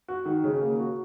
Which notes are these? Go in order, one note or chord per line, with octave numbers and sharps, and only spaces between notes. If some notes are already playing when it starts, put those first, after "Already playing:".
F#4
D#3
C#3
A#3
F#4